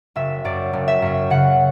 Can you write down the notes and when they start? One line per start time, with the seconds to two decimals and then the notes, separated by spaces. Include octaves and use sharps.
0.16 F#1 E5
0.45 F#2 D5
0.73 F#1
0.88 E5
1.02 F#2
1.30 C#3 F#5